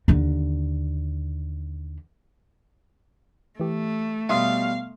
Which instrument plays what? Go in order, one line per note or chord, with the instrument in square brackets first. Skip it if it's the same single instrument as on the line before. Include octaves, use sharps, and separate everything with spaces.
[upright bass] D#2 D3
[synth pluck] E3 G4 [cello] A3
[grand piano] B2 G3 [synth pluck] E5 C6 D#6 [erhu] F5